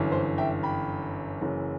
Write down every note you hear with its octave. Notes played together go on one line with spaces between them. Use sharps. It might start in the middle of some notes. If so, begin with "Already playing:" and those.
Already playing: G1 F#2 E3
C5
E5 G5
G5 B5
F#1 F#2 E3